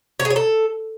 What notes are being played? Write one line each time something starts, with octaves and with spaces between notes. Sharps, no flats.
C#5
G#4
C#5
A4